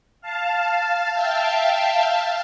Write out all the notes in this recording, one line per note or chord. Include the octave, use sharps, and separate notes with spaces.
F5 A5
E5 G5
F5 A5